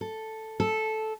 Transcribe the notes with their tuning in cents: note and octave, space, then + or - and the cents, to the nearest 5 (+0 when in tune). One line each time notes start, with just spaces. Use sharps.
A4 +0
A4 -10